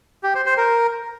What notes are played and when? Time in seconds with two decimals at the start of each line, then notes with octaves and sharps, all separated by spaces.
0.23 G4
0.35 C5
0.46 C5
0.57 A#4